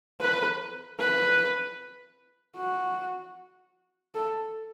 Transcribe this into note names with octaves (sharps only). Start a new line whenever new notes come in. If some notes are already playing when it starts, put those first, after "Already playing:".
B4
B4
F#4
A4